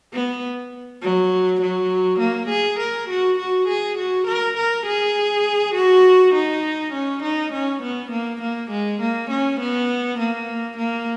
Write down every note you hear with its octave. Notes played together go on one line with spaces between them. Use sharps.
B3
F#3
F#3
A#3
G#4
A#4
F#4
F#4
G#4
F#4
A#4
A#4
G#4
F#4
D#4
C#4
D#4
C#4
B3
A#3
A#3
G#3
A#3
C#4
B3
A#3
A#3